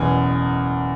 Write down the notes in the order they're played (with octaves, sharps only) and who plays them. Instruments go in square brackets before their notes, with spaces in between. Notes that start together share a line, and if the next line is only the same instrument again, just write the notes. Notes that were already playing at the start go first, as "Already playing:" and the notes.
Already playing: [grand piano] F#1 E2 B2 G#5